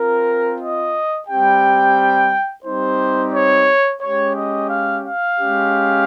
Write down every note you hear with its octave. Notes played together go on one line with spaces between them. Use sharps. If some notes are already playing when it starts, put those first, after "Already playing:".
Already playing: C4 F4 A#4
D#5
G3 C4 G4 G5
G3 C4 D#4 G4 C5
C#5
G#3 C#4 G4 C#5
D#5
F5
F5
G#3 C#4 G4